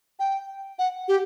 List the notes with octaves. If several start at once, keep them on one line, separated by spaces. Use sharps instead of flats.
G5
F#5
G4